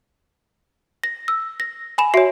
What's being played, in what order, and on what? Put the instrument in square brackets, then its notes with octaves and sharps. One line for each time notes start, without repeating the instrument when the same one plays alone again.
[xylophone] A#6
E6
A#6
G#5 B5 E7
[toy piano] F#4 E5 G#5 [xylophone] C#5 C7